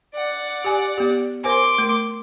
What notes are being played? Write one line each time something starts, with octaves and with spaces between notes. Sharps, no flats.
D5 F#5
G4 G#5
B3 G4
A#4 C5 G#5 C6 D6
A3 A#4